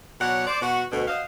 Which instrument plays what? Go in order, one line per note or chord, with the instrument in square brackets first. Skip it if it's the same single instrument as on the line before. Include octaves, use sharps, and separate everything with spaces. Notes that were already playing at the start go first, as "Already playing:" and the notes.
[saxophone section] B2 F#3 C#5 D5 F#5
C5 D5
B2 F#4
D2 B2
F#4 C5 D#5 F5